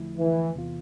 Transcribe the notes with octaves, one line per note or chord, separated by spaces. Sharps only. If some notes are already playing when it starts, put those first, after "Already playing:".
Already playing: E2 D3 F3 A3 E4
E3
E2 C3 E3 B3 F4